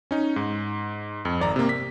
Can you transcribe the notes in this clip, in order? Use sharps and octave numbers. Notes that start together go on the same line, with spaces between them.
C#4 D#4
G#2
F2
G#1 D5 A#5
C3 A#3
B6